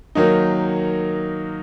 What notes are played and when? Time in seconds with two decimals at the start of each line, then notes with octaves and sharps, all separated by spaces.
0.15 D#3 F#3 A#3 D#4